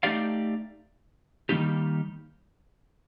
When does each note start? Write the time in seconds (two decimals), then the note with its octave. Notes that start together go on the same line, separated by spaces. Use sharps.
0.03 A3 D#4 G4 D5 F5
1.49 D#3 G3 A#3 D#4 G4